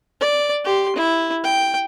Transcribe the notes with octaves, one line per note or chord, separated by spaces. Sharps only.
D5
G4 C6
E4
G5